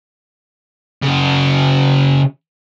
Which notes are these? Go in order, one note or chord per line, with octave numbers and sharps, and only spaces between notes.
C#3 F#4